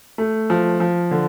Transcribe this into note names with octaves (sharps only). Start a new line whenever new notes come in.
A3
F3
F3
D3